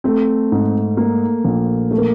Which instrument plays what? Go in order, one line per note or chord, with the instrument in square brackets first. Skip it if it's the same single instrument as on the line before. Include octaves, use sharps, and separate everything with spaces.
[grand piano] A3 [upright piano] C4
[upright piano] G#2
A#3
A#1
[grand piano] A3
A#3